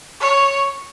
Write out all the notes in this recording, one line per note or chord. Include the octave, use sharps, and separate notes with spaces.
C#5